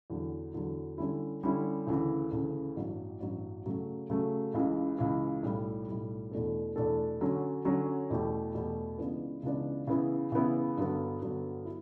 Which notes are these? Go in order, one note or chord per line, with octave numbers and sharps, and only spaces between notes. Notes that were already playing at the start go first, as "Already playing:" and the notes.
E2 D3 F#3
E2 D3 F#3
D3 G3 C#4 E4
D3 G3 C#4 E4
D2 C#3 E3
D2 C#3 E3
A1 G2 F#3
A1 G2 F#3
C#3 F#3 A3
C#3 F#3 A3
C#2 C#3 E3
C#2 C#3 E3
B1 A2 G3
B1 A2 G3
E2 B2 A3 D4 A4
E2 B2 A3 D4 A4
D3 F#3 C#4
D3 F#3 C#4
E2 B2 A3 E4 G4
E2 B2 A3 E4 G4
C#2 C#3 E3 B3 D4
C#2 C#3 E3 B3 D4
C#3 E3 B3 E4
C#3 E3 B3 E4
G2 D3 F#3 B3
G2 D3 F#3 B3
E4